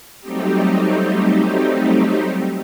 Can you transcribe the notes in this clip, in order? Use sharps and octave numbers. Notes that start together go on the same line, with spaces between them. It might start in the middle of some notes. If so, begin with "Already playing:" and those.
F#3 G3 A3 C4 D#4 G4